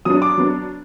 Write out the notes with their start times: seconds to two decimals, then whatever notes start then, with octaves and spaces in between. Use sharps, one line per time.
0.05 F#3 B3 D4 D#6
0.22 D6
0.38 F#3 B3 D4